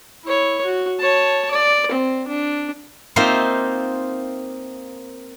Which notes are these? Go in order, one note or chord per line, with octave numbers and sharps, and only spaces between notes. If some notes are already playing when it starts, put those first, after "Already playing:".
E4 C#5
F#4
C#5 A5
D5
C4
D4
A#3 C4 D#4 F4 C5 E5